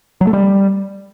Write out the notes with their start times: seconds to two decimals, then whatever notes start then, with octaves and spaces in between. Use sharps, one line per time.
0.21 F#3
0.27 A3
0.33 G3